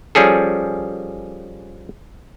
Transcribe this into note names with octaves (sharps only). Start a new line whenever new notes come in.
F3 G3 C#4 G#4 A4